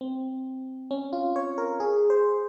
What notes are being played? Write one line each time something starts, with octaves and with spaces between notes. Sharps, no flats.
C4
C#4
F4
C#5
A#4
G#4
C5